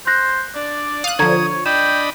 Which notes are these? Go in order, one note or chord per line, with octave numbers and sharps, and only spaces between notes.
C5 C6 F#6 A#6
D4 D5
F5 D#6 F#6
D3 F3 C#5 A#5 G#6
D4 D#5 G5 B5 E7